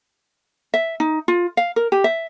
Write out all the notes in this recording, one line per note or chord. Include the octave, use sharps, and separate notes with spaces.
E5
D#4
F4
F5
A#4
G4
E5